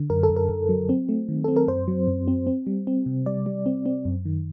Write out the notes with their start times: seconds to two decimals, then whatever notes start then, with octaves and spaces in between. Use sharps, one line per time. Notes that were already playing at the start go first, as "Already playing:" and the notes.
Already playing: D3
0.10 F#2 A#4
0.23 A4
0.30 F#2
0.36 A#4
0.49 F#2
0.69 F#3
0.89 C4
1.09 A3
1.29 D#3
1.44 C4 A4
1.56 A#4
1.68 F#2 C5
1.88 F#3
2.07 F#2
2.28 C4
2.47 C4
2.67 G3
2.87 C4
3.06 C3
3.26 G3 D5
3.46 G3
3.66 C4
3.86 C4
4.05 F#2
4.25 D#3